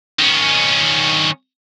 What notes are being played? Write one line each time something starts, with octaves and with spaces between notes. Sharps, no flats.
D#3 C#4